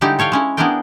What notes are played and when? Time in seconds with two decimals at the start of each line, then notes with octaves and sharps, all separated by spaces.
0.01 D3 G3 G#3 D#4 E4 G4
0.19 A4 C#5 F5 G5
0.32 G#3 C#4 E4
0.57 B3 D4 E4 G#4 A#4 G5